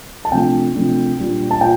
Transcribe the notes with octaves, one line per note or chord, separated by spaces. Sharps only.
A5
C3 F3 A3 D4 G5
C3 F3 A3 D4
A#2 G3 D4
A5
A#2 G5